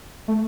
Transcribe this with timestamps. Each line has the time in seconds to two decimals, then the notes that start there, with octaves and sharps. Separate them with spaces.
0.28 A3